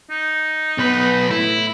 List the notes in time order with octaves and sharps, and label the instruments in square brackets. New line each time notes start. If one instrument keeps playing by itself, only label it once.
[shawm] D#4
[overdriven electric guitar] B1 B4 [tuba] B3
[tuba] A2 [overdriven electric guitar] E4